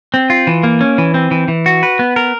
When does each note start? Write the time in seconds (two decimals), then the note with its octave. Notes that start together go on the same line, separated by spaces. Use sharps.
0.14 C4
0.30 F4
0.47 E3
0.63 A#3
0.81 C#4
0.98 E3
1.14 C4
1.31 E3
1.48 E3
1.66 F#4
1.83 B4
1.99 B3
2.16 A#4